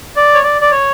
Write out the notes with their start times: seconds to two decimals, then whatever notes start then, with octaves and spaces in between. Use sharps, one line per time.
0.16 D5
0.35 C#5
0.43 D5
0.61 D5
0.71 C#5